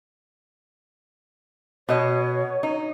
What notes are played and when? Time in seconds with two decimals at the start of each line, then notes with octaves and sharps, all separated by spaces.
1.89 B2 C#5 D#5
2.63 D#4